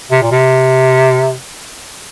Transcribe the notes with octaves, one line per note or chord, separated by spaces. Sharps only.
C3
A#2
C3